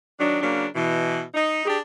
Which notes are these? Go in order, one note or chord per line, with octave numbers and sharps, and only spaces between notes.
D#3 F#3 D4
C#3 F#3 A#3 D4
B2 E3
D#4
D4 G4 G#4